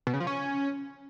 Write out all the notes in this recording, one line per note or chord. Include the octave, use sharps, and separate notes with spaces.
B2
C#3
F3
C#4